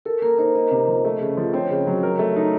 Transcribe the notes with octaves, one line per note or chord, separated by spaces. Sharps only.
A4 A#4
A#3 A#4
D#4 C5
A#3 D#5
C3
F3
A3
C#3
F3
C4 C#5
C#3
F#3
A#4
A3
D#4